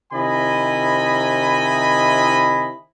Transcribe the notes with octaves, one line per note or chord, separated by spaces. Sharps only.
C3 D#3 E4 D#5 G#5 B5